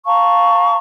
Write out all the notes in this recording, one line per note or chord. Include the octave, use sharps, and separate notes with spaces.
F5 A5 A#5 C#6